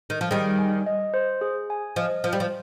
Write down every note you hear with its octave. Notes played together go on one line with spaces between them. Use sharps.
D#3
F3
D#3 G3 G#4
G#5
D#5
C5
G#4
G#5
F3 D#5
F3 C5
G3
F3